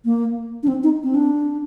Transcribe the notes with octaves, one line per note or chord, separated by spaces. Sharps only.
A#3
D4
C4
D#4
C4
D4